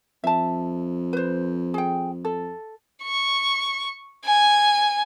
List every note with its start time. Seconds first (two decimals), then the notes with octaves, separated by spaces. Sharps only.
0.24 F2 E5 A5
1.13 B4 C5
1.74 G#4 G5
2.25 A4
3.03 C#6
4.25 G#5